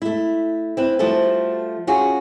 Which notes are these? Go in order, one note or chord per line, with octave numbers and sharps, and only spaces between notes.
A3 E4
C4 E4 B4
F3 G3 A3 F#4 A4
C#4 F4 F#4 G#4